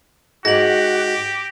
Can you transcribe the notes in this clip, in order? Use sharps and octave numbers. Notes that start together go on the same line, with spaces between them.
G#2 F#4 G4 A#6 F#7